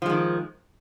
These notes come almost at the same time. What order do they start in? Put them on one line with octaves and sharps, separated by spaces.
F3 G#3 D#3